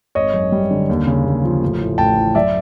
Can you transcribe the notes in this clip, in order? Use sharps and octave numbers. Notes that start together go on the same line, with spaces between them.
G#1 C#5 D#5
F#2
G3
D3
D#2
C#3
D#2
F3
A1
A2
A1 G5 A5
E3
F#2 D5 E5